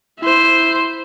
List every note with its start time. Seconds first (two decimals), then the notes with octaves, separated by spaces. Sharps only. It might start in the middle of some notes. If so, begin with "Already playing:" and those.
0.19 E4 C5